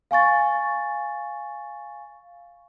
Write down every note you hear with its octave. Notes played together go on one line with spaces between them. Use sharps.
F5 G#5 C#6 A6